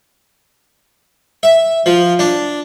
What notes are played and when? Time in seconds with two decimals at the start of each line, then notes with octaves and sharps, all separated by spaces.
1.43 E5
1.86 F3
2.19 D4